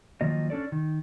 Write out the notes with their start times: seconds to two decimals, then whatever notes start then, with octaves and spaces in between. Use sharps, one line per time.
0.21 D#3 F3 F#3 A#3 D#5
0.50 C#4 D4 A4 D5
0.72 D#3